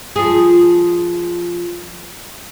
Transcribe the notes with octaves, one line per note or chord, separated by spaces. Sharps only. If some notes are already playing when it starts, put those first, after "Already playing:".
F3 G#4